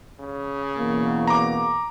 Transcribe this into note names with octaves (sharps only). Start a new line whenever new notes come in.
C#3
E2 B2 A#3
A#5 D6